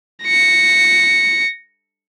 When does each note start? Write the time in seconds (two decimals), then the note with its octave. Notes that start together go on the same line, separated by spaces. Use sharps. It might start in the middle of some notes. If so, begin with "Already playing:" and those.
0.24 A#6 C#7